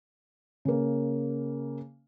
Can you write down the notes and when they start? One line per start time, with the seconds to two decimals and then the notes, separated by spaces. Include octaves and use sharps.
0.65 C#3 A#3